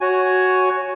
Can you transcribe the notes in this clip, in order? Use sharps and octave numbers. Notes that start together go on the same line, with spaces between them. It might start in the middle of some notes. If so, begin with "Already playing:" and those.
F#4 C#5 G#5